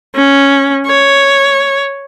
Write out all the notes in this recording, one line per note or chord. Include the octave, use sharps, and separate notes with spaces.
C#4
C#5